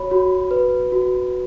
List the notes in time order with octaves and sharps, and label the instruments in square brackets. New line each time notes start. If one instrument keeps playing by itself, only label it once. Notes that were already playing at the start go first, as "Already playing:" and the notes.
Already playing: [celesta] F#4 C#5 B5
F#4
B4
F#4